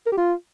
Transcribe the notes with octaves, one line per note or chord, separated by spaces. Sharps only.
A#4
G4
F4